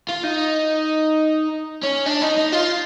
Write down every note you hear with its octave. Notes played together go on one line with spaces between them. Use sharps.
F4
D#4
C#4
D4
D#4
D#4
F4